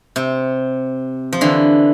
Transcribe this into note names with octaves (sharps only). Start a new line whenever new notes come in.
C3
F3
D3 E3